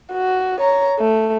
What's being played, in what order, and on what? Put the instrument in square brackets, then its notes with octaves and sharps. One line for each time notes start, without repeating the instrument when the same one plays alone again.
[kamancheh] F#4
C#5 A#5
A3